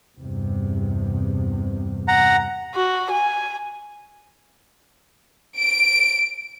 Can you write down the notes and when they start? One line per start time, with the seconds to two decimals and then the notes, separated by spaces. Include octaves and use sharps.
0.18 E2 G2 C3
2.08 F#5 A#5
2.75 F#4
3.11 G#5
5.61 D7